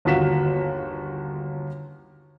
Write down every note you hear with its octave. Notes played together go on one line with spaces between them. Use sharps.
G1 D#2 F4 F#4 B6 E7